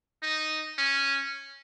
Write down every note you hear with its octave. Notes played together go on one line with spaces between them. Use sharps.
D#4
C#4